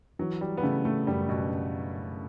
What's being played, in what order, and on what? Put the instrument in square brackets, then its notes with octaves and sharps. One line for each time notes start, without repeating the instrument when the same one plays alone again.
[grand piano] E3 [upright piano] F#3
[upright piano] G3
B3
[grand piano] C#3 [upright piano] A3
[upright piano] A3
[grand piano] F#2 [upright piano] G3
[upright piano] B2